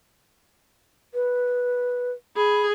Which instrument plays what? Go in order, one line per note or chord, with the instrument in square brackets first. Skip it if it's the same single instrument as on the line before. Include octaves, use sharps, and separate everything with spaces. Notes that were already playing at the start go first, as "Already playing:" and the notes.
[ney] B4
[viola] G#4 [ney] B5